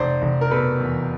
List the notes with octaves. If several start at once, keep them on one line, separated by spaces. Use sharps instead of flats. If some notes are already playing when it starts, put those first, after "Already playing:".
Already playing: F1 C5 D5
F1
A#4
B2 A4 B4
E2